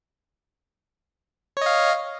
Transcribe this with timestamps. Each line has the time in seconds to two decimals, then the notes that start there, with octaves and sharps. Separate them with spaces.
1.57 C#5
1.61 D#5
1.66 F5